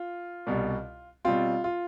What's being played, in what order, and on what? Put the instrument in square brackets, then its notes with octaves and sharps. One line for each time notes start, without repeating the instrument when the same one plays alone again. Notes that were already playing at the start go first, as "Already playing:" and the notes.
Already playing: [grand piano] F4
C2 B2 G3
B2 G3 C4 F4
F4